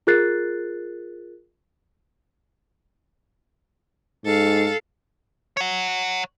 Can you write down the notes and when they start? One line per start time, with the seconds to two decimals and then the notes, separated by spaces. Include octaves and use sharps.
0.07 F4 G#4 A#4 F#6 A6 C7
4.25 G#2 A4 F5
5.57 C#5 F#5